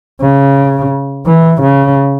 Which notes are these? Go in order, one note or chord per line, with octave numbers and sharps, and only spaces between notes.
C#3
E3
C#3